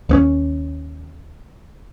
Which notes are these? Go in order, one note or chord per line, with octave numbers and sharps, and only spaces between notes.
D#2 B3 C#4